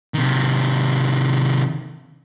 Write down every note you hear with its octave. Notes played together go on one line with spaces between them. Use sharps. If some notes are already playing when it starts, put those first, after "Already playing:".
C3 D#3